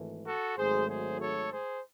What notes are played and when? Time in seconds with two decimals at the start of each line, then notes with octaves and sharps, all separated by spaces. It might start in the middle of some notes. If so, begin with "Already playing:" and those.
Already playing: G#1 G#2 E3 A3
0.25 F#4 A4
0.57 G#1 G#2 F#3 A3 G#4 C5
0.88 G#4 C5
1.20 A4 C#5
1.51 G#4 C5